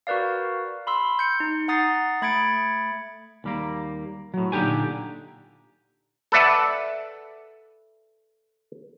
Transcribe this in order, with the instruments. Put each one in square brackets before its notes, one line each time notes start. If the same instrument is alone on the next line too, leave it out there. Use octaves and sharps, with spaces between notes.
[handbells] F#4 A#4 B4 D5 F5
B5 C6 E6
G6 C#7
D#4
F#5 A#5 D#6 A6 C7
A3 B5 G#6 A6 C#7 D7
[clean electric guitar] D#2 G3 A#3
A2 F#3
A#2 D3 D#4 G4 G#5
[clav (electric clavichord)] A4 B4 D5 E5 F#5